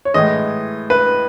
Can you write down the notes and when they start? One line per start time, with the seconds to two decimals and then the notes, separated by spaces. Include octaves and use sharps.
0.05 C#5
0.14 A2 E3 G#3 D#5
0.90 B4